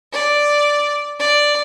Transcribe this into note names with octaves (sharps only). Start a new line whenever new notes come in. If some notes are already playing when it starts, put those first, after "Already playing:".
D5
D5